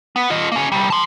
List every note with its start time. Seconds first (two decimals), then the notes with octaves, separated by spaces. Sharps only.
0.16 B3
0.30 F4 D#5
0.52 A#3 C#4
0.72 C2 G3
0.90 A5 C6